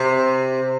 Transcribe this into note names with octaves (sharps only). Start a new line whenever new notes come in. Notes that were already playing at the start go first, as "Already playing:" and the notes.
Already playing: C3